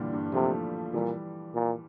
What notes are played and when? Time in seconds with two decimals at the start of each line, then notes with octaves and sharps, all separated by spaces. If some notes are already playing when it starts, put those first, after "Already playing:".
Already playing: A#2 D3 E3 G3
0.13 G2 A#2
0.33 C3 F3 A3
0.93 A#2 E3 G3
1.54 A#2